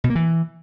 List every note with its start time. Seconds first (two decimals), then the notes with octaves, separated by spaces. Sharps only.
0.04 B2
0.10 A#3
0.15 E3